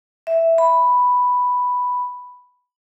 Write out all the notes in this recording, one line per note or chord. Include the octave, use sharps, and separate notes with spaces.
E5
B5